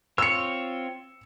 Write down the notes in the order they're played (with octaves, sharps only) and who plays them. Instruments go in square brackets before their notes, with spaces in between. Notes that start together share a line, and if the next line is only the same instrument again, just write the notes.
[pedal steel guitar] C4 F4 C#5 [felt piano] E6 C#7